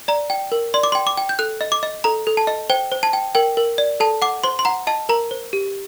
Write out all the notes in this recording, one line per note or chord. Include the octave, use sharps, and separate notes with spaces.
D5 A#5
G5
A#4
D5 C6
D6
G5 C6
D6
G5
G6
A4 F#6
D#5
D6
D#5
A4 A#5
A4
A5
D#5
C5 G5
C5
A5
G5
A#4 G5
A#4
D5
A4 A5
F#5 D6
C5 C6
C6
F#5 A#5
D#5 A5
A#4 A#5
C5
G4